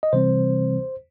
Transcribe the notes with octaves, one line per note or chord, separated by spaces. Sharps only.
D#5
C3 E3 G3 C4 C5